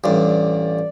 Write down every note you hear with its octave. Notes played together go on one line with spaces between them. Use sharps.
A1 G2 D5